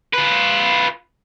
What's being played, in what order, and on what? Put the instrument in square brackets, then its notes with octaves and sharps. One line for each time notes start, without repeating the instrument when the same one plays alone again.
[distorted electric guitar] F4 B4